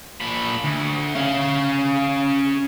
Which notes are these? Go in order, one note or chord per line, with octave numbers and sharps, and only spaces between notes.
A#2 B5
D2
C#4 F5